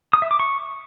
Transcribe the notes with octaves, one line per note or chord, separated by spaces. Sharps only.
D#6
E5
D6
C#6